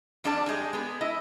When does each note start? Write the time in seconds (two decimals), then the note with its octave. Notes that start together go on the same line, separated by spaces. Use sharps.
0.24 F2 G3 D4 G#4 D5 A5
0.46 G#3 G4 G#4 D#5
0.73 G#3 B3 G#4
1.01 E4 D#5